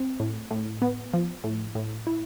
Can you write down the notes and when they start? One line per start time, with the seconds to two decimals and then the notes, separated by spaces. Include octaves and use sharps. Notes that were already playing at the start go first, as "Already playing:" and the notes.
Already playing: C4
0.20 A2
0.51 A2
0.82 B3
1.13 F3
1.44 A2
1.75 A2
2.07 E4